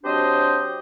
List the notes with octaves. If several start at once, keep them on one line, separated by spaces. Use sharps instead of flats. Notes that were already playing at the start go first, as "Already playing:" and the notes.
F#3 C4 D4 G4 C5 D#5